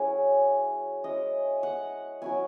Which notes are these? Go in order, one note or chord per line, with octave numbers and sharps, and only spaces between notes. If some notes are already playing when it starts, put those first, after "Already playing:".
Already playing: F#3 C#4 E4 G#4
G#3 C#4 E4 D#5
F#5
F#3 C#4 E4 G#5